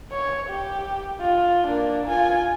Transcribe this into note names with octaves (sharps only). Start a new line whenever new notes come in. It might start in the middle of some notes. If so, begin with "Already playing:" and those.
C#5
G4
F4
A#3 D4
F4 G#5